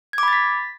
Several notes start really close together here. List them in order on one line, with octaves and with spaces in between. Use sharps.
G#6 D6 B5 A6 B6